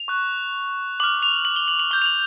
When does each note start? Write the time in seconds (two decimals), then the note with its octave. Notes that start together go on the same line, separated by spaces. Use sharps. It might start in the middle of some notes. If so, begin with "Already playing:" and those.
Already playing: F7
0.08 C#6 F#6
1.00 D6 F6 F#7
1.23 F7
1.45 F#7
1.56 G7
1.68 F#7
1.80 F#7
1.91 D6 G6 G7
2.02 F7
2.06 F#7